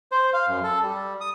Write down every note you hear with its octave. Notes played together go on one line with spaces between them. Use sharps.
C5
F5
F#2
A4
G3
D#6